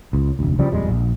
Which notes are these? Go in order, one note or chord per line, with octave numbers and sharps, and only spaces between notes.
C#2
F1 D2
C#3 F3 G3
D#1 F2 G3 G#3
A#1